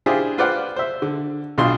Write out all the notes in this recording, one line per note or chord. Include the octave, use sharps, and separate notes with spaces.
D4 E4 F4 G4 G#4 C5
F4 B4 C5 D5 F5 F#5
C5 E5
D3
B1 B2 D4 F4 C6